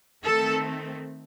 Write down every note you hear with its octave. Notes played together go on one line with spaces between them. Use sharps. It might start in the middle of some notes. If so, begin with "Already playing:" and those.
D#3 A3 C4 A4